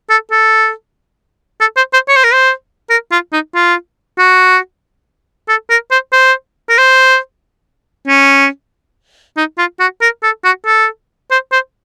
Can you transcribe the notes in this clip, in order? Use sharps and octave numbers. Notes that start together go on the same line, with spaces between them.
A4
A4
A4
C5
C5
C#5
C5
A#4
C5
A#4
F4
D#4
F4
F#4
A4
A#4
C5
C5
A#4
C5
C#4
D#4
F4
F#4
A#4
A4
F#4
A4
C5
C5